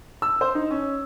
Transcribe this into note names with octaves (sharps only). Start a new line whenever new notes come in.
E6
C5
D#4
C#4